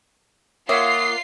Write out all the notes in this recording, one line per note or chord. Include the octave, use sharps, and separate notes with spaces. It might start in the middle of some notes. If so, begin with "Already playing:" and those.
A#3 F4 C#5 E5 F#5 D#6 C7